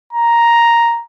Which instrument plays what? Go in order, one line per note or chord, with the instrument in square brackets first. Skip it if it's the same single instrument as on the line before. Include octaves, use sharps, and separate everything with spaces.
[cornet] A#5